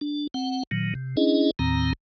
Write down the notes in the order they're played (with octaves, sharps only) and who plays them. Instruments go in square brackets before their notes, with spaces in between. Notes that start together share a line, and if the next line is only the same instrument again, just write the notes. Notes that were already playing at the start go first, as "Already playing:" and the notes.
[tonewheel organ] D4
C4 F#5
A#2 D#3 F#3
C3
C#4 D4 E4 G#4 D#5
D#2 A2 D#3 C4 A#5